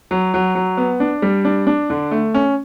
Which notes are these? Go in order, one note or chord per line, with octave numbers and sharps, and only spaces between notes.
F#3
F#3
F#3
B3
D4
G3
D4
D4
D3
A3
C#4